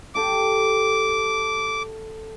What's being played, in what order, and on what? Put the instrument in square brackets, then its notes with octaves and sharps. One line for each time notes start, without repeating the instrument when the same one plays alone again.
[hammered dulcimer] G4 A4 G5 [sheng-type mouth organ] D6